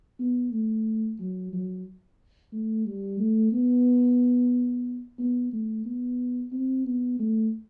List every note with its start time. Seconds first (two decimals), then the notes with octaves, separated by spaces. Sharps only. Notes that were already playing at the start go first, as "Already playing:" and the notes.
0.19 B3
0.52 A3
1.19 F#3
1.53 F#3
2.52 A3
2.86 G3
3.19 A3
3.53 B3
5.19 B3
5.52 A3
5.85 B3
6.52 C4
6.85 B3
7.19 A3